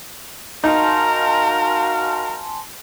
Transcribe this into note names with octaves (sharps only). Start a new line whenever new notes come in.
D#4 F#4 A#4 F5 G#5 A5 C6